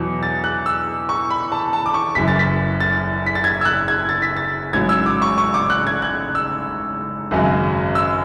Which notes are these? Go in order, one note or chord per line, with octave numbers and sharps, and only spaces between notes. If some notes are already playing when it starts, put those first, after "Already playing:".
Already playing: E2 B2 F#3
A6
F#6
E6
C#6
B5
A5
A5
D6
C#6
F#1 F#2 E3 B6
A6
B6
A6
B6
A6
G#6
E6
F#6
G#6
A6
B6
A6
A1 G#2 F#3 G#6
E6
D6
C#6
C#6
D6
F#6
G#6
F#6
E6
G#1 F#2 C#3 F#3
E6